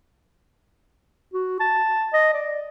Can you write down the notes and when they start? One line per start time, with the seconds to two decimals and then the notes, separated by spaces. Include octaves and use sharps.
1.34 F#4
1.60 A5
2.13 D#5
2.34 D5